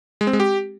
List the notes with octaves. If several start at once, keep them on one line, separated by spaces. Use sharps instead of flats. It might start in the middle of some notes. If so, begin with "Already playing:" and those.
G#3
C4
G#3
G4